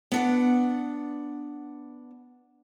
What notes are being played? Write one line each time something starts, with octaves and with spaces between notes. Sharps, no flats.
B3 D4 F#5